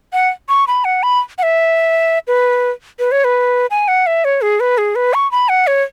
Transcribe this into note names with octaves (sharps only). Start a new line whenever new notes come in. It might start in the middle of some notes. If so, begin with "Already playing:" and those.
F#5
C#6
B5
F#5
B5
F#5
E5
B4
B4
C#5
B4
G#5
F#5
E5
C#5
G#4
B4
G#4
B4
C#6
B5
F#5
C#5